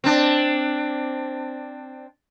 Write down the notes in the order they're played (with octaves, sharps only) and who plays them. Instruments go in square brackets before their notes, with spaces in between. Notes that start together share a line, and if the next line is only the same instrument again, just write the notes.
[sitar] C4 D4